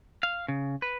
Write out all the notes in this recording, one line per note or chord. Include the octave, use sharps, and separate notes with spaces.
F5
C#3
B4